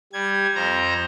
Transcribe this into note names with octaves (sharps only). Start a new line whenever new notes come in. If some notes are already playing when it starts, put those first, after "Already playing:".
G3 G#6
F2 C5 A#5